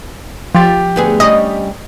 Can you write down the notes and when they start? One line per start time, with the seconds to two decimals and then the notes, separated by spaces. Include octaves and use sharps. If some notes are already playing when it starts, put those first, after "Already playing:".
0.55 F3 G4 A6
0.96 D2 B3 G#4
1.20 G3 C#4 D#5